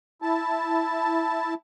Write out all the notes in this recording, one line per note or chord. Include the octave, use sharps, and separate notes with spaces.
E4 A5